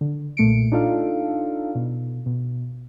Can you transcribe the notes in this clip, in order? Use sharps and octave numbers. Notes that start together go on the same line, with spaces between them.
D3
B1 A#2 A3 C#7 D7
D4 D#4 F4 A4 F5
B2
B2